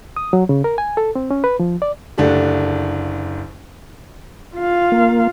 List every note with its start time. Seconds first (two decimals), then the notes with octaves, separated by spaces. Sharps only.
0.17 D#6
0.33 F#3
0.49 C#3
0.64 A#4
0.78 G#5
0.97 A4
1.15 C4
1.31 C#4
1.44 B4
1.60 F3
1.82 D5
2.18 F#1 D3 A3 D4 G4
4.56 F4 F5
4.92 A#3